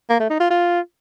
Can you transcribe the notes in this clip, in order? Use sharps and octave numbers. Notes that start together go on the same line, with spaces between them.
A#3
A3
D#4
F4
F4